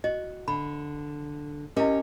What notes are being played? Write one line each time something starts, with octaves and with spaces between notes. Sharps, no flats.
F#4 D#5
D3 B5
C#4 E4 G4 A#4 D#5